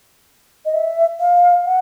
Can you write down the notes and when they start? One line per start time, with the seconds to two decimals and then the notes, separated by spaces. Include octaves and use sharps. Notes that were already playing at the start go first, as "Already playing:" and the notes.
0.65 D#5
0.74 E5
1.20 F5
1.65 F#5